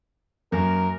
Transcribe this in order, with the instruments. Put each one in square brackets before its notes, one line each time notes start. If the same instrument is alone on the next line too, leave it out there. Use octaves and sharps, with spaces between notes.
[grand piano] F#2 A#3 [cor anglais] A#4